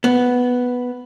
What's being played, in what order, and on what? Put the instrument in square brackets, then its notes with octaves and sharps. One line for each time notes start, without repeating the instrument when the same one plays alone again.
[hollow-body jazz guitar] B3